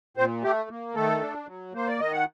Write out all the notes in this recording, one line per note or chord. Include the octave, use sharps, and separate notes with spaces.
A#2 C4 C5
A3 G4
A#3
D#3 A3 A4
D4
F#3
A#3 C5
D5
D#3 D#5
F#5